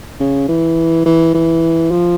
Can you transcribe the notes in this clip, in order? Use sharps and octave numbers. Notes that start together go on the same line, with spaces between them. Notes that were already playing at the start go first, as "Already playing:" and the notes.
C#3
E3
E3
E3
F3